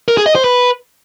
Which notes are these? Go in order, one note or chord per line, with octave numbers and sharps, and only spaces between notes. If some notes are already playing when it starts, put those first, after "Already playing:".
A#4
G#4
D#5
C5
B4